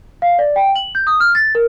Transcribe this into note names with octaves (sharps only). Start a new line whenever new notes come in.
F5
D5
G5
F#7
G6
D#6
F6
A6
A#4